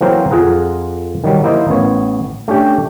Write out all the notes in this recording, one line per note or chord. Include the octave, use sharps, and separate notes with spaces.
E3 F#3 A#3 C4 A#4 C5
F2 F4 G#4 F#5 A#5
D#3 F#3 G3
A#3 E4 C5 D#5
A1 B3 C#5
A3 C#4 D4 G4